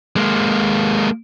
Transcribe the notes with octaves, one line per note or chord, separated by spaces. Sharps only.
G#3 A#3